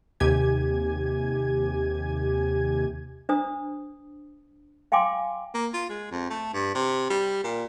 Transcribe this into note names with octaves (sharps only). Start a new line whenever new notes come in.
D#2 C3 G4 G#5 G#6
D4 C5 A#5 D#6
F5 G5 G#5 C6 D6
A#3
F4
G#3
F2
A3
G2
C3
G3
A#2